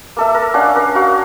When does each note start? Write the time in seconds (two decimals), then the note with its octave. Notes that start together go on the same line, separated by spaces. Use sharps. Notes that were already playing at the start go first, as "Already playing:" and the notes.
0.17 A#3 A4 E5
0.35 A#4
0.54 C#4 D4 F5 F#5
0.76 A#4
0.95 F#4 F5